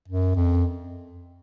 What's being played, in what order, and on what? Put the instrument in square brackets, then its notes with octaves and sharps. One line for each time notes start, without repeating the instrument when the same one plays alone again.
[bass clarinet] F#2
F2